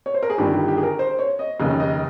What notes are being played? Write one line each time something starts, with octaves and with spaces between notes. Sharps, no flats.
C#5
C5
A#4
G#4
G1 G2 D#3 G3 G4
G4
G4
G#4
A#4
C5
C#5
D#5
F1 D#2 C#3 D#5
D#5